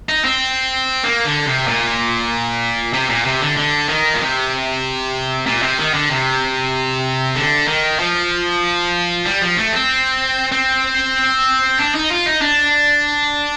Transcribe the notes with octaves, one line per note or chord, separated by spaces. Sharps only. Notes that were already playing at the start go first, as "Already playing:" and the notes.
D#4
C4
A#3
D3
C3
A#2
C3
A#2
C3
D3
D3
D#3
A#2
C3
A#2
C3
D#3
D3
C3
D3
D#3
F3
G3
F3
A3
C4
C4
D4
D#4
F4
D#4
D4